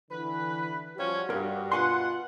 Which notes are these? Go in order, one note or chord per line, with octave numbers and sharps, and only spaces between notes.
D3 E3 B4
F3 G3 C#4 F#4 G4
G2 A#4
B2 F4 B4 F#5 G#5 C6